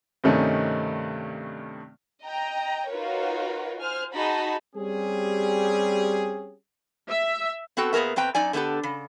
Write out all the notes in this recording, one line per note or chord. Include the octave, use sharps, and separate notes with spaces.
G2 C3 D#3 A3 C#4 D#4
D#5 G5 A#5
D#4 F4 F#4 A#4 B4 C#5
C5 G#5 F6
D#4 F#4 G#4 D#5 A5 B5
G3 C4 C#4 G4 G#4
E5
B3 C4 F#4 A4 G5
A#2 B3 G#4 A#4 E5
B2 C4 B4 G5 A#5
F#2 D#4 D5 G#5
D3 A3 B3 G4 A4
C#3